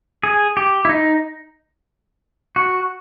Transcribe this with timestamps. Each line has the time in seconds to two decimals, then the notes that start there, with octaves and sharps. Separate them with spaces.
0.23 G#4
0.57 G4
0.85 E4
0.89 D#4
2.56 F#4